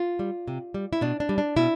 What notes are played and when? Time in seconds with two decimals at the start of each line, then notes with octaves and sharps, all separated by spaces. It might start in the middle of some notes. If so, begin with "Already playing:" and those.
Already playing: F4
0.19 G3
0.48 C3
0.74 G3
0.93 E4
1.01 B2 D4
1.20 D4
1.29 G3
1.38 D4
1.56 B2 E4